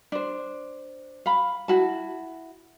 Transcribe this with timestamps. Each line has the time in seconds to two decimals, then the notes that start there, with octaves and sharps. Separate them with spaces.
0.12 D4 C5
1.26 F5 B5
1.68 E4 F#4 A5